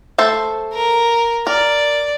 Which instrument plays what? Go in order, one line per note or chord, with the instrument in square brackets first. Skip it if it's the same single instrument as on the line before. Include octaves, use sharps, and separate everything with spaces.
[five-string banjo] A3 A4 C5
[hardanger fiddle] A#4
[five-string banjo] A#4 [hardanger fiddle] D5